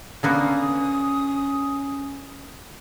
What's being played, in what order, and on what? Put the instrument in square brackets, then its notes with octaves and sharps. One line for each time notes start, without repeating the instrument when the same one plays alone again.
[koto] D3 A#3 B3 [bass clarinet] C#4 [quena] D#6